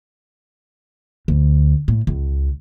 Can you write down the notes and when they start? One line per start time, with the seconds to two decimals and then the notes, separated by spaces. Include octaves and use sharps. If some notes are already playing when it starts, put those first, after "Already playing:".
1.28 D2
1.88 A2
2.07 C#2